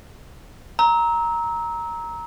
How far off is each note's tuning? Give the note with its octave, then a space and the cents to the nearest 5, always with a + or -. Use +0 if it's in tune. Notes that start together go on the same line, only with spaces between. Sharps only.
A#5 +5 E6 -30